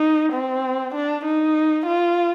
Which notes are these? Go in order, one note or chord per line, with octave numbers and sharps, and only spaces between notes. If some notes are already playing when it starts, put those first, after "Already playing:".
Already playing: D#4
C4
D4
D#4
F4